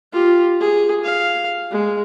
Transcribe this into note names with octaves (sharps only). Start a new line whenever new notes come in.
F4 G4
G#4
F5
G#3